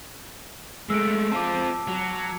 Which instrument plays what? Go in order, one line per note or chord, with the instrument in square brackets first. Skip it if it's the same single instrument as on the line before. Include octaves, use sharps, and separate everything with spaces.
[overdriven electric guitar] G#3 A3 [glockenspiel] E6 D7
[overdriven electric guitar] C4 F4 [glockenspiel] A5 D6
[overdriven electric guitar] F#3